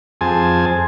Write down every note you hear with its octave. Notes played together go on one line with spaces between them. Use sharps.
F2 C4 G#4 G#5 A5